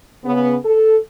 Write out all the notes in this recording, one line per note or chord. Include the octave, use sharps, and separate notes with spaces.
C#3 B3
A4